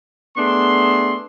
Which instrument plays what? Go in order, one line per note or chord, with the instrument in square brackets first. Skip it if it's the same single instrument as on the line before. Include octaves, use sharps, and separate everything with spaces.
[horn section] A3 B3 D4 G#4 C6